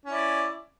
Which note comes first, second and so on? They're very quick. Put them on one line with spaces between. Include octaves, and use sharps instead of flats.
C#4 E4 D5